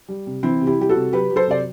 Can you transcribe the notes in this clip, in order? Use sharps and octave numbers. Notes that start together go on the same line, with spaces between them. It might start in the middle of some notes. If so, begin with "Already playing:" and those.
G3
C3
E3 C4 E4
C3
E4 G4
G3 G4
F#4 A4
C3
F#3 G4 B4
F#3
A4 C5
C3 D5